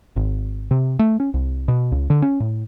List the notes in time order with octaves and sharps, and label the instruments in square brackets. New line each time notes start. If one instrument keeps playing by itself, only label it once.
[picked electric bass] G#1
C3
A3
C#4
C2
B2
C#2
D3
C#4
A2